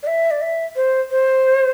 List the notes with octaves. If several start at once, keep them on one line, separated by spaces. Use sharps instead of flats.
D5
E5
D5
E5
C5
C5